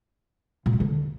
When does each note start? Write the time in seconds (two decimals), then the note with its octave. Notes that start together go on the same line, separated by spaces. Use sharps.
0.66 A#2
0.73 G#3
0.80 D3